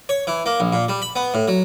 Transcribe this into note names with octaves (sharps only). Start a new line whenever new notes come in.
C#5
E3
A#3
A#1
A#2
G3
B5
B3
A2
F#3